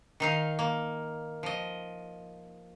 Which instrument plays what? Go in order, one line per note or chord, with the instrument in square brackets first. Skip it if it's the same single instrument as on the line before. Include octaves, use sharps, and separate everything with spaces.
[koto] D#3 D#4 F5
A#3
F3 D#5